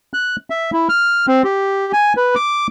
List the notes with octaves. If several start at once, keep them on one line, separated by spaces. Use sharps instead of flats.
F#6
E5
E4
F6
C4
G4
G#5
B4
D6